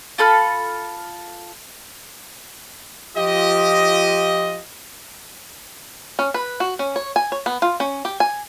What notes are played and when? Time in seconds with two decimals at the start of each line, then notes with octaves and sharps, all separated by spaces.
0.18 F4 A4 B5 F6
3.16 F3 F4 G4 D#5
6.19 C#4
6.34 B4
6.60 F#4
6.79 C#4
6.96 C#5
7.16 G#5
7.32 C#5
7.46 B3
7.62 F4
7.80 C#4
8.05 G4
8.20 G#5